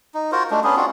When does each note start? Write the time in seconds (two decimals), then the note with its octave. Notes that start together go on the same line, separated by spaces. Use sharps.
0.14 D#4
0.32 F4 F#4 A#4 C5
0.51 G#3 A3 D4
0.64 B3 C#4 D4 G#4
0.77 C4 D4 F4 F#4